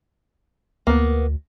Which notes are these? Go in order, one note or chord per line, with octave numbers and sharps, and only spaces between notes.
D2 A#3 B3